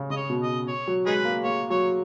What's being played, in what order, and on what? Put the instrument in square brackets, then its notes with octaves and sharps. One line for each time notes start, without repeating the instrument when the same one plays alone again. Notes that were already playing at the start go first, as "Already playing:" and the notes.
Already playing: [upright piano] C#3
[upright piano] C#3 [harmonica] D#5
[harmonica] C#5
[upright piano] B2
[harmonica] D#5
C#5
[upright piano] F#3
[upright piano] G#3 [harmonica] D#4 G#4 B4
[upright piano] A#3
[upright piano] A#3 [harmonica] C#5
[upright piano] F#3 [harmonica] C#5